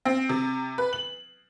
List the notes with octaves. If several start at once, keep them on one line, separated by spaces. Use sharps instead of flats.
C4
C3
B4
F#7